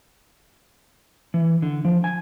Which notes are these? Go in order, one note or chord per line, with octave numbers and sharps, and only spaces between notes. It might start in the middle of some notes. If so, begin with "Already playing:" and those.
E3
D3
F3
G#5